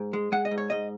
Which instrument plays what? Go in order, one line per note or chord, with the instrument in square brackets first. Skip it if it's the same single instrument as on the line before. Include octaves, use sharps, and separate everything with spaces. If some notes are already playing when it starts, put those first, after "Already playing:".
Already playing: [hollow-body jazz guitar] G#2
G#3
G#3 F#5
D#5
G#2
C#5
G#2 D#5